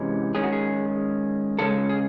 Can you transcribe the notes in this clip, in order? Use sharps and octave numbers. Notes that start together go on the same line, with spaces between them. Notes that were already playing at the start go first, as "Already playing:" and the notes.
Already playing: C3 E3 G#3 C#4
D#3 G#3 C#4 G#4
F#4
G#4
C#3 G#3 C#4 A4
G#4